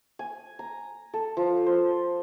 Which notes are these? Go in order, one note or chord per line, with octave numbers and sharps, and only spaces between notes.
G#5
A#5
A4
F3
C5